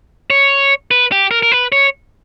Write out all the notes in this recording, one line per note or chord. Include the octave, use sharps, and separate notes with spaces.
C#5
B4
G4
A#4
A#4
B4
C#5